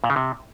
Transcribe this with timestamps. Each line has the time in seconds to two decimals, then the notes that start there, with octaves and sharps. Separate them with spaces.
0.04 A#2
0.10 C#3
0.16 C3